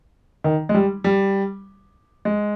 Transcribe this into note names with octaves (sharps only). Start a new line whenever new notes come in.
D#3
G#3
G3
G3
G#3